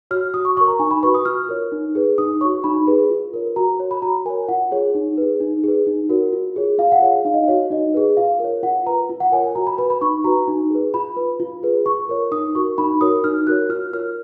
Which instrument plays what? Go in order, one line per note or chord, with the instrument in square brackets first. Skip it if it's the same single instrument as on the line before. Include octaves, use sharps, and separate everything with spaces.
[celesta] F#4 C#5 F6
F#4 D#6
C#6
C#5 C#6
A#4
A#5
D#4 G#5
B5
F#4 B4 C#6
D#6
F4 F6
A#4 C#5
D#4
G#4 B4
D#4 D#6
F#4 C#5 C#6
D#4 B5
G#4 B4
F4
A#4 C#5
F#4 A#5
C#5
B5
F#4 A#5
A#4 G#5
C#5
F4 F#5
G#4 C#5
D#4
G#4 B4
D#4
G#4 B4
D#4
F#4 A#4 C#5
F4
G#4 C#5
F4 F5
F#5
G#4 C#5 F5
D#4 F5
D#5
F5
F#4 C#5
D#4 D#5
G#4 B4
F4 F5
A#4 C#5
F4 F#5
B4 A#5
F4
F#5
A#4 C#5 G#5
G#5
F#4 A#5
B5
B4 B5
B5
D#4 C#6
F#4 B4 A#5
D#4
G#4 B4
F4 B5
B4
F4
G#4 B4
F4 C#6
A#4 C#5
D#4 D#6
F#4 A#4 C#6
D#4 B5
F#4 A#4 C#5 D#6
D#4 F6
F#4 A#4 C#5 F#6
F4 F6
A#4 C#5 F6